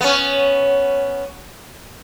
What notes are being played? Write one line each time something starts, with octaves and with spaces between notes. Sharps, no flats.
B3 C#4